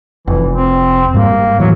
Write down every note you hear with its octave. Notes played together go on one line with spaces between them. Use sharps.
F1 E3
C4
G#2 G3 A#3
A2 E3 F#3